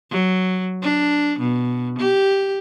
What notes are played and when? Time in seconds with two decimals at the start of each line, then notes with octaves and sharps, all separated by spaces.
0.11 F#3
0.82 D4
1.39 B2
1.99 G4